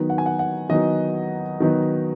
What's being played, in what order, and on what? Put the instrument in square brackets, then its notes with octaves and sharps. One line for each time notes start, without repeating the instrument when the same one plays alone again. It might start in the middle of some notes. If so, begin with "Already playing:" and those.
Already playing: [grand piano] D#3 F#3 B3 D#4
F#5
G#5
F#5
F#5
D#3 F#3 B3 D#4 D#5
D#3 F#3 B3 D#4